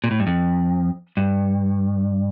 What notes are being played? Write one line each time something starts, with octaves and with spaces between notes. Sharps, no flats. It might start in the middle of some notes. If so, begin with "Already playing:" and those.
A#2
A2
G2
F2
G2